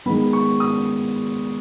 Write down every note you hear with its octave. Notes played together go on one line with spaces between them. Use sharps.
D#3 G#3 B3 B5
C#6
D#6